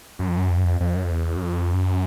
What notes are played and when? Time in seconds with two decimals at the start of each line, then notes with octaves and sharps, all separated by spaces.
0.19 F#2
0.28 F2
0.37 F#2
0.50 F2
0.57 F#2
0.64 F2
0.80 F2
0.96 F#2
1.04 F2
1.11 E2
1.36 F#2
1.43 F2
1.73 F#2